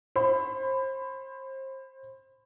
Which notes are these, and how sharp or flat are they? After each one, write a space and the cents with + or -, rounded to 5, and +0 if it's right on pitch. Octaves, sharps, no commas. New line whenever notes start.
C5 +30 B5 +25